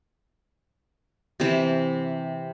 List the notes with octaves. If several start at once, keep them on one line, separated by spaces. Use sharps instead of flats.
C3 E3